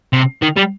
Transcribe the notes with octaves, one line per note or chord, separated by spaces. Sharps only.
C3
D#3
G3